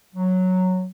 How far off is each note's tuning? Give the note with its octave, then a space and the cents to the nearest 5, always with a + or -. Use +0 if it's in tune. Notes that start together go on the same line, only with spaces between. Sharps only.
F#3 -5